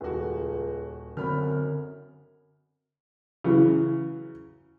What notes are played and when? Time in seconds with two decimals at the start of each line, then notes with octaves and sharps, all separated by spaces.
0.01 D#1 C#2 F#4
1.17 F#2 D3 B3 C4 B5 F6
3.44 C#3 E3 F#3